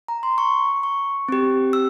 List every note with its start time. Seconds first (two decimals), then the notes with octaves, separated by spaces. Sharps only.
0.08 A#5
0.23 C6
0.38 C#6
0.83 C#6
1.28 C4 G4
1.73 E6